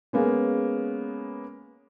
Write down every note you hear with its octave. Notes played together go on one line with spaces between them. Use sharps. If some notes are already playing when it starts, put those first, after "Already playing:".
G#3 A#3 B3 C#4